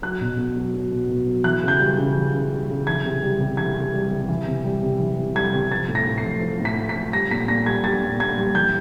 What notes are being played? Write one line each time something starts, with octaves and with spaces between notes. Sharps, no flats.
F#3 F#6
B2
B2
F#3
F#3
B2
B2
F#3
E3 F#6
C#3
G6
G3
C#3
E3
C#3
G3
C#3
E3 G#6
C3
G3
C3
E3 G#6
C3
G3
C3
E3
C3
G3
C3
E3
C3
G3 G#6
C3
F3 A6
A2
A#6
A2
C7
F3
F3
A2
B6
A2
B6
F3
G3 A#6
A#2 B6
A#2 A#6
G3 G#6
G3 A6
A#2
A#2 G#6
G3
E3 G6